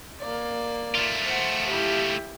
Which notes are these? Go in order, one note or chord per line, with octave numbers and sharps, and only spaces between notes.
A#3 D5
A3 F4
C5 F#5
E4 G4